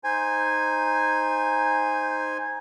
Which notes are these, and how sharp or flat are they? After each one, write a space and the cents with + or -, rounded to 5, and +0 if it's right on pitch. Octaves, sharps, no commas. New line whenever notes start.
D#4 +0 C5 +0 G#5 -10